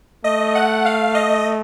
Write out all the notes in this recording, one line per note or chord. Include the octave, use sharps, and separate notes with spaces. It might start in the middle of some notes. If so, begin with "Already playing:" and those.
A3 D#5
F#5
F5
D#5